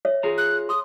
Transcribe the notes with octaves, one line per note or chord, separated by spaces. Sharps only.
C#5 E5
F4 G#4 A#5
F#6
C6 D#6